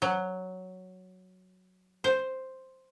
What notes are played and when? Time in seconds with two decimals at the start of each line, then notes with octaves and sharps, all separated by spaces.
0.02 F#3
2.04 C5